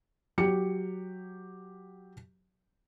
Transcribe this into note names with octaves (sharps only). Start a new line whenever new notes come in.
F#3 G4 C#7